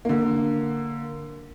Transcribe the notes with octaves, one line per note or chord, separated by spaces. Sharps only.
D3 A#3